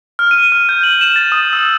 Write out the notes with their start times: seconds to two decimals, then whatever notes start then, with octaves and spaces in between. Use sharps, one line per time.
0.19 F6
0.31 D#7
0.52 F6
0.69 G6
0.83 F#7
1.01 E7
1.16 A6
1.32 D#6
1.53 E6